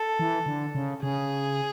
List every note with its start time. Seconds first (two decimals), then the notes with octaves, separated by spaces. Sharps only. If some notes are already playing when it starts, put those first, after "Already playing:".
Already playing: A4
0.19 E3
0.46 D3
0.75 C#3
1.03 C#3 G#4